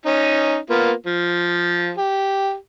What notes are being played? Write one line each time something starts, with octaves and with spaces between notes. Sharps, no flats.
C#4 D#4
A#3 B3 F4
F3
G4